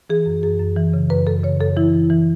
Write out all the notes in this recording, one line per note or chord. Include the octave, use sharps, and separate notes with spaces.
E3 G#4
F#2
F#2 G#4
F#2
E3
C#3
F#2 B4
F#2 A4
C#3 C#5
F#2 A4
E3 E4
E3
E3